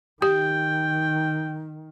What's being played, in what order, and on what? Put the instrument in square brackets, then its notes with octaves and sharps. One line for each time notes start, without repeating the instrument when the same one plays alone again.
[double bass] D#3 [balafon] G4 [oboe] G5